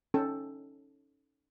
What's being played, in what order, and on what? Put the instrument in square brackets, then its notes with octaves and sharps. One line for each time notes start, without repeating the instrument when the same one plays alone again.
[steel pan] C#4 D#4 A4 G5